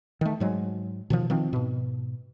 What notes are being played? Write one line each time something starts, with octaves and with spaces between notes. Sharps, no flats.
D#3 A3
G#2 F#3 G#3
B2 D#3 F3
D#3 F3 C4
G#2 B2